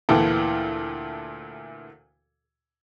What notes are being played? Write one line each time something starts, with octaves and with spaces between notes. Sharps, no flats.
D2 A#2 E3 B3 A4 G5